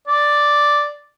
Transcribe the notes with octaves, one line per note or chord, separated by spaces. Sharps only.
D5